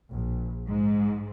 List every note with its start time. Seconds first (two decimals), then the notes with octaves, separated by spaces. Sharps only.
0.13 A#1
0.67 G#2